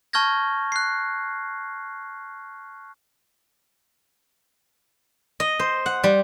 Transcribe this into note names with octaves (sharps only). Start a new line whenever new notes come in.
A5 C#6 F6 G6 G#6 A#6
F#6 C7
D#5
C5
F#5
G3